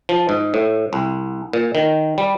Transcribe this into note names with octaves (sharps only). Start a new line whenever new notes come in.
F3
G#2
A2
C2
A#2
D#3
G3